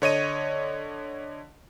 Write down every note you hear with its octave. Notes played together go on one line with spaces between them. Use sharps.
D3 C#5 D#5 D#7